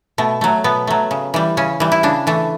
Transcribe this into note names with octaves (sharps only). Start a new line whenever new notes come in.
B2 A3
F#3 A3
B2 B3
F#3 A3
C#3
E3 G3
C#3 C#4
E3 G3
E4
C#3 D4
E3 A3